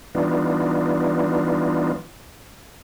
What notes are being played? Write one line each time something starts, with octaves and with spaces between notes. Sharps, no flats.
E3 G3 B3 D4 D#4 F4